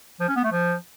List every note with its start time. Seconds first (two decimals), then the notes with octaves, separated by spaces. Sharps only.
0.20 F3
0.28 C#4
0.36 B3
0.44 A3
0.52 F3